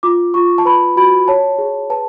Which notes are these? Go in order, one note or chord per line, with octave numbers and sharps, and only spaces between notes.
F4 D6
F4 C#6
A5
B4 B5
F#4 B5
C#5 A5
G#4
B4 A5